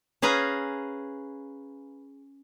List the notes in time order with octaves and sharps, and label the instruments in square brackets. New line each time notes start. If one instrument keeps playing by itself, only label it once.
[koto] C#4 G#4 B4 F5 A#5